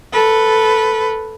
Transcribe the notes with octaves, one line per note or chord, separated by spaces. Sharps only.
A4 B4